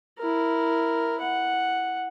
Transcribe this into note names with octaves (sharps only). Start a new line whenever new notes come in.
E4 A#4
F#5